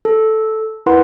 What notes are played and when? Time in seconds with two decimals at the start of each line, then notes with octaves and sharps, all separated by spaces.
0.05 A4
0.86 E4 A#4 B4 F#5 C6